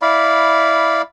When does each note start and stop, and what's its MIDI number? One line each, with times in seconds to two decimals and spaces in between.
0.02 1.02 64
0.02 1.02 74
0.02 1.02 77
0.02 1.02 83